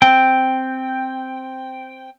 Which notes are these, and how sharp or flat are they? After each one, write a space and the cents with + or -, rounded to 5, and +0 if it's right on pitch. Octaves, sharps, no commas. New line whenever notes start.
C4 +0 G5 +0